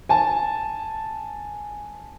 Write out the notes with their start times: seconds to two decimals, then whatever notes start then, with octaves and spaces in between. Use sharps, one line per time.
0.09 G#5 A5